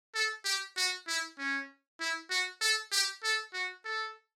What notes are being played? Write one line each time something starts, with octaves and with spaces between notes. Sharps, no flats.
A4
G4
F#4
E4
C#4
E4
F#4
A4
G4
A4
F#4
A4